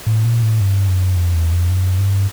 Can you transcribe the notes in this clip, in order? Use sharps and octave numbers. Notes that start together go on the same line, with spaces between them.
A2
A#2
A2
G2
F#2
F2
E2
F2
F#2
G2